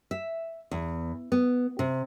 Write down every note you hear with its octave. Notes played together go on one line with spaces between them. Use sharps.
E5
E2
B3
C3